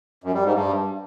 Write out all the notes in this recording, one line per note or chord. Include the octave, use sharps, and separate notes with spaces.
F#2
G3
G#2
G2